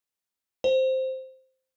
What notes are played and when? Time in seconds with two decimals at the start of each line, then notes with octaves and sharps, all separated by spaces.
0.64 C5